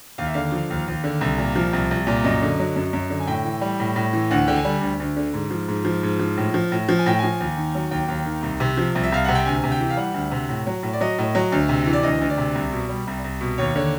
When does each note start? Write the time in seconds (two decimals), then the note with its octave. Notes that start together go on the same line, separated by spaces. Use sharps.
0.18 D#2 F5
0.27 E5
0.34 D3 F5
0.52 F3
0.70 D#2
0.88 D#2
1.04 D3
1.21 C2
1.38 A#2
1.56 F3
1.73 C2
1.91 C2
2.07 A#2
2.24 F#2 D#5
2.42 D3
2.59 F#3
2.76 F#2
2.93 F#2
3.10 D3
3.20 G#5
3.27 A2 G5
3.45 E3
3.61 G3
3.80 A2
3.96 A2
4.13 E3
4.31 D2 F#5
4.48 D3 G5
4.57 G#5
4.65 G3
4.82 D2
5.00 D2
5.16 D3
5.34 G#2
5.51 F3
5.68 G#2
5.85 F3
6.03 G#2
6.19 F3
6.37 A2
6.54 F3
6.72 A2
6.89 F3
6.99 G#5
7.06 A2 G5
7.19 F3 G#5
7.40 D#2
7.57 D#3
7.75 F#3
7.91 D#2 G5
8.08 D#2
8.25 D#3
8.43 C2
8.60 C3
8.77 F3
8.95 C2
9.03 E5
9.12 C2 F5
9.25 C3 F#5
9.35 G5
9.46 D2 G#5
9.63 C3
9.72 G5
9.80 E3
9.90 F5
9.97 G3 F#5
10.14 D2
10.31 C3
10.49 A2
10.67 F#3
10.83 A2
10.93 D5
11.01 F#3 D#5
11.18 A2
11.35 F#3
11.52 D2
11.69 C3
11.86 E3
11.93 D5
12.03 D2 D#5
12.21 D2
12.30 D5
12.37 C3
12.55 C2
12.72 B2
12.89 G3
13.07 C2
13.24 C2
13.41 B2
13.58 D#2 C#5
13.75 D3 C#5